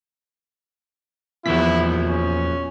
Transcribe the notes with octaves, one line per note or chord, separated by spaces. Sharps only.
E2 A#2 F3 E4 F#4 B6
C#4